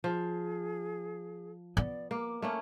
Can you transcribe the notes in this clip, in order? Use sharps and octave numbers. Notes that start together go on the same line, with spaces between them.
F3 G#4
B3 D5
A#3 D6
A3 A#3 C#4